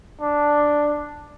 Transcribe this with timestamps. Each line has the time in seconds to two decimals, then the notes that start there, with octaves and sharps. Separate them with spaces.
0.21 D4